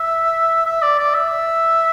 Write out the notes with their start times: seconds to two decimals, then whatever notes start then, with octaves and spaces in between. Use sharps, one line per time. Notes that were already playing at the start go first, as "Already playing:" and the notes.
Already playing: E5
0.66 E5
0.82 D5
0.99 D5
1.14 E5